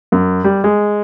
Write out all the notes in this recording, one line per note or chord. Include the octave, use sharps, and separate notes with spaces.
F#2
G3
G#3